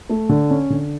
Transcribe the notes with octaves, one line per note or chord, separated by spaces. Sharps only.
A3
D3
C#4
D3